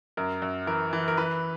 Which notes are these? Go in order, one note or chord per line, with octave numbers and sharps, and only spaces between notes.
F#2 A#4
F#2
E3 A#4
E3
A#4
E3 B4